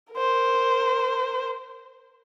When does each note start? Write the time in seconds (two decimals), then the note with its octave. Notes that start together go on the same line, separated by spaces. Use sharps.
0.14 A#4 C5